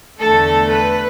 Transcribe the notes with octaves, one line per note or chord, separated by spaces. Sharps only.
E2 D3 A3 A4
B4